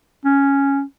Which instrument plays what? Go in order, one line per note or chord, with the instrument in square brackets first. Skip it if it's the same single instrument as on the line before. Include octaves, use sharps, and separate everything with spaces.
[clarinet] C#4